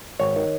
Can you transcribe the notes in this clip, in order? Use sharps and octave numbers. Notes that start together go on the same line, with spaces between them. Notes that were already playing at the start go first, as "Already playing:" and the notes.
G#1 C#5
D#3